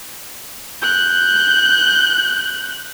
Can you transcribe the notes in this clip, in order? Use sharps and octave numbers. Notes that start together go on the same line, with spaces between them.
F#6 G6